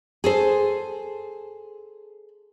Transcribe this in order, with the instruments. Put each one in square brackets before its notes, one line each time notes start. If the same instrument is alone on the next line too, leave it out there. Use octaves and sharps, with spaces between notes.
[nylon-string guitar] G#4 A4 C5